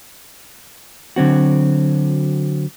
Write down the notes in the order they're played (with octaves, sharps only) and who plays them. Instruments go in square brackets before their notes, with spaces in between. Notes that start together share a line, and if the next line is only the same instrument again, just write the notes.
[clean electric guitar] D3 F#3 C4 F#4